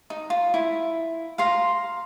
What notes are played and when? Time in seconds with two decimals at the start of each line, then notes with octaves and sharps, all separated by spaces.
0.10 D#4
0.30 F4
0.54 E4
1.38 F5 A#5 C6